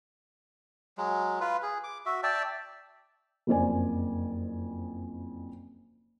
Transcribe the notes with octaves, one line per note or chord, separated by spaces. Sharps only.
F#3 G#3
F4 B4
G#4
D6
F#4 E5
D5 E5 G5 A5
F#1 F2 C5 D5 G#5